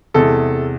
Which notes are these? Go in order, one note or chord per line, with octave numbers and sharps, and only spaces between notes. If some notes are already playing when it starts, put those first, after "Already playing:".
E2 C3 G#3 A4